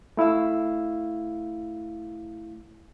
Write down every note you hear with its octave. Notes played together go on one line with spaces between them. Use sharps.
A3 E4 F5 E6